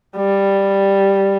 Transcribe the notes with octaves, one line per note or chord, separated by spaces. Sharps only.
G3